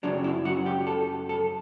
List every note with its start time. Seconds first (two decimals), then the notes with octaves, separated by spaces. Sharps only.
0.03 F#2 C#3 F#3 D4
0.24 E4
0.45 F#4
0.66 G4
0.87 A4
1.29 A4